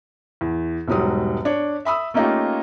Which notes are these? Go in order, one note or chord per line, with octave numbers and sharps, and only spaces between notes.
E2
E1 G#2 F#3 G3 D#6
D4 C#5
E5 B5 D#6 E6
A3 A#3 C#4 D#4 F4 G4